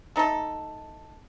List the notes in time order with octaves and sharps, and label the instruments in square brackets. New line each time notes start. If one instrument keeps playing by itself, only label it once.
[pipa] A3 D#4 A4